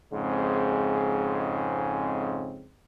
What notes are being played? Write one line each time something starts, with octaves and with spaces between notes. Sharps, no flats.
F2 G#2 C#3 G#3 C4